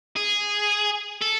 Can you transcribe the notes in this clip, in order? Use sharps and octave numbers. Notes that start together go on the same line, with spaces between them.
G#4
A4